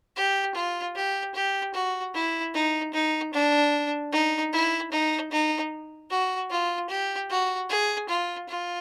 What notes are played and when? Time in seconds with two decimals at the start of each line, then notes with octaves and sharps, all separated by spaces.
0.17 G4
0.55 F4
0.96 G4
1.35 G4
1.74 F#4
2.14 E4
2.54 D#4
2.94 D#4
3.33 D4
4.12 D#4
4.53 E4
4.92 D#4
5.32 D#4
6.10 F#4
6.51 F4
6.90 G4
7.30 F#4
7.70 G#4
8.09 F4
8.49 F4